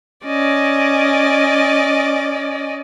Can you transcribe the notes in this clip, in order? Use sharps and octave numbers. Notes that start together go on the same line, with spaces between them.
C#4 D5 D#5